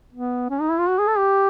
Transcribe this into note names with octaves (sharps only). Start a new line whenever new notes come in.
B3
C#4
D#4
E4
F4
F#4
G#4
A4
G4